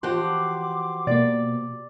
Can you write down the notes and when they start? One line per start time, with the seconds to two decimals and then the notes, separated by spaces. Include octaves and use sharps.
0.03 E3 F3 F#4 G4 F#5 C6 D6
1.07 B2 A#3 D5